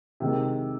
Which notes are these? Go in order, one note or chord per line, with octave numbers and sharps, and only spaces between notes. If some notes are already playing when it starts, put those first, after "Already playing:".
C3 D#3 G#3